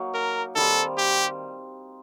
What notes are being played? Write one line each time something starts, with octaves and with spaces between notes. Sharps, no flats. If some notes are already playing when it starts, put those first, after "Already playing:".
Already playing: F#3 A#3 D#4
A#4
D#3 G3 C4 A4
G4